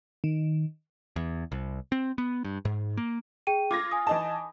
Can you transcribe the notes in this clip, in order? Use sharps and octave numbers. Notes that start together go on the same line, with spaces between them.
D#3
E2
C2
C4
B3
G2
G#2
A#3
G#4 G5 D#7
F4 D6 G#6 A#6
G#5 D#6
E3 D#4 A5